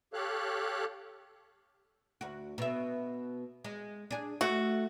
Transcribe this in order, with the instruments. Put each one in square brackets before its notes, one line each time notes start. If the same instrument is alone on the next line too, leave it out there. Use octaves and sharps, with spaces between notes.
[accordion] G4 A4 C#5 F5 F#6
[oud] D2 F#4
B2 E5
G#3
D4 G#4
[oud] A3 [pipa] F#4